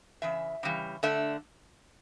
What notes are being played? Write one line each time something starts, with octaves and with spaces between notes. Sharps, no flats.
C#3 E3 E5
C#3 E3 G3
D3 A3 E5